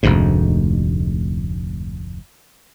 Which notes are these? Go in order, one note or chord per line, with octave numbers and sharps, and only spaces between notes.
F1 D2 G#2